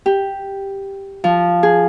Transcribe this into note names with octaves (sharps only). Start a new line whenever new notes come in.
G4
F3
G#4